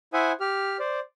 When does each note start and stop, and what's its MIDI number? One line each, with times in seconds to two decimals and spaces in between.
0.13 0.32 64
0.13 0.32 72
0.13 0.32 76
0.13 0.32 78
0.13 0.32 80
0.13 0.32 87
0.40 0.77 67
0.40 0.77 89
0.79 1.00 72
0.79 1.00 74